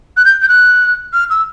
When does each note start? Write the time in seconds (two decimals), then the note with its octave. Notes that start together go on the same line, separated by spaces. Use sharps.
0.17 F#6
0.25 G6
0.42 G6
0.49 F#6
1.13 F6
1.30 E6